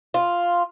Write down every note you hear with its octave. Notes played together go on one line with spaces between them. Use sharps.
F4